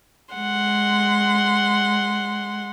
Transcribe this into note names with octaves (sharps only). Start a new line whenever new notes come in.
G#3 F#5 C6